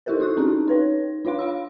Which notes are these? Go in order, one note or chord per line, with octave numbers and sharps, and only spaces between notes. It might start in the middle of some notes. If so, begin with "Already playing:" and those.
D#4 E4 G4 A4 A#4 C5
D#4 F#4 C#6 F#6
C4 C#4 D#4 G#4
D#4 B4 C#5
D4 F4 C#5 F5 C6
F5 B5 E6